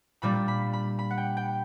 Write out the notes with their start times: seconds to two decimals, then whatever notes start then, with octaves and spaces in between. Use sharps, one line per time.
0.22 A#2 G3 A#3 D4 B5
0.48 B5
0.73 B5
0.99 B5
1.11 F#5
1.18 G5
1.37 G5